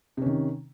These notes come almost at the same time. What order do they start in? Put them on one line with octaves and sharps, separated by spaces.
C3 C#4 D#3